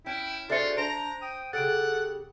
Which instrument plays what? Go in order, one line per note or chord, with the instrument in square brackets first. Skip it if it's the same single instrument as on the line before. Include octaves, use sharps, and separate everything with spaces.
[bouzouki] C#4 [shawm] E4 [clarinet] G5
[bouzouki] D4 G#4 C5 [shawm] F4 [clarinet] F#4 [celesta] A4 E5 C#7
[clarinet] D4 [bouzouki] C5 [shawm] A#5 [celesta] D7
[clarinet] G5 [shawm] D#6
[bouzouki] C#3 G4 [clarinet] A4 [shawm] F#5 [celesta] A6 D7